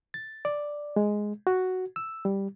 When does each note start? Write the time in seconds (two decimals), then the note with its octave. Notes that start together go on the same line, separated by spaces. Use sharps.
0.14 A6
0.45 D5
0.96 G#3
1.47 F#4
1.96 E6
2.25 G3